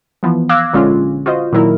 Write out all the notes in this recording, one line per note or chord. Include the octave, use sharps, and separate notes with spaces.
E3 F3 B3
F5 D6 E6 F#6 G#6 A#6
A#1 D3 G#3 C#4 F4
F4 F#4 C5 D#5
A#2 D#3 F#3 E4 A#4